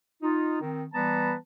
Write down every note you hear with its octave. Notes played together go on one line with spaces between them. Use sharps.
D#4 F4
D#3 C4
E3 G3 B3 B4 A5 A#5